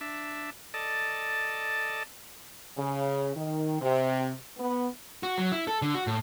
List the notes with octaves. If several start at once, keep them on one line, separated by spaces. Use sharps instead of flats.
D4 E5
A4 D5 D#5 A5
C#3
D#3
C3
B3
F#4
F#3
E4
A4
D3
F#4
A2